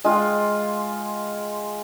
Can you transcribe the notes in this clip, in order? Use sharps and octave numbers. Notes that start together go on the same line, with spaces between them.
G#3 F4 G5